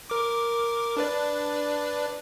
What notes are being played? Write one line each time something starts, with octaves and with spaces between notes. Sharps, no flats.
A#4 D6
D4 B4 D5